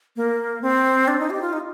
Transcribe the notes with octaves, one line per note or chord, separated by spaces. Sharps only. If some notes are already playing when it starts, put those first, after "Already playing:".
A#3
C4
D4
D#4
G4
F4
D#4